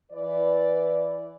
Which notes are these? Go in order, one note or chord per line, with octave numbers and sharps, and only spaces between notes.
E3 B4 D5